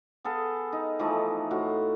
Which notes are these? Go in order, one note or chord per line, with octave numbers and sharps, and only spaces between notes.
B3 G#4 A4 F5
D#4
E3 F3 A3 D#4
A2 F4 F#4